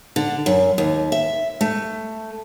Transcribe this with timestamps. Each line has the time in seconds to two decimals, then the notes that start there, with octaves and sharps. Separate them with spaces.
0.16 D3
0.46 F#2
0.78 D#2
1.12 E5
1.61 A3